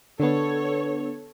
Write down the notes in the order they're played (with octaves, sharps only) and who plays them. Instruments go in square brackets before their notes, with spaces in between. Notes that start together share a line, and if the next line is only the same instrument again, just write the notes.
[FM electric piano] D3 B3 [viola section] A4 C#5